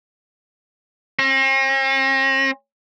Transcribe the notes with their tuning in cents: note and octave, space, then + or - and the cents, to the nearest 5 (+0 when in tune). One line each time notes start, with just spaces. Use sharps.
C4 +45